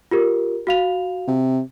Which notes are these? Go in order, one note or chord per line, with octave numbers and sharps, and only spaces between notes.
F4 G4 A#4
F#4 F5 F7
C3